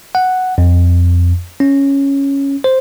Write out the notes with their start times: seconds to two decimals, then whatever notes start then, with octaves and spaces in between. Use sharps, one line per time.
0.15 F#5
0.58 F2
1.60 C#4
2.64 C5